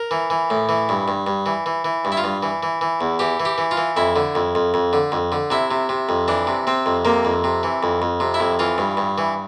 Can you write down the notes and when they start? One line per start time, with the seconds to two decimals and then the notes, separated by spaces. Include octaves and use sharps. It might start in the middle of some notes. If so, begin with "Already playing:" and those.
Already playing: A#4
0.11 E3
0.30 E3
0.50 A2
0.69 E3
0.89 G2
1.08 G2
1.27 G2
1.46 E3
1.66 E3
1.85 E3
2.05 G2
2.12 E4
2.17 F4
2.24 G2
2.43 E3
2.63 E3
2.81 E3
3.01 E2
3.19 E3 G4
3.40 E3
3.45 G4
3.58 E3
3.71 F4
3.77 E3
3.97 F2 E4
4.16 D3
4.35 F2
4.55 F2
4.74 F2
4.93 D3
5.12 F2
5.32 D3
5.50 C3 E4
5.71 C3
5.89 C3
6.09 F2
6.28 E3 D4
6.47 C3
6.67 C3 C4
6.86 F2
7.05 C3 A#3
7.25 F2
7.44 C3
7.63 E3
7.83 F2
8.02 F2
8.20 C3
8.34 E4
8.40 F2
8.59 E3 F4
8.78 G2
8.97 G2
9.18 E3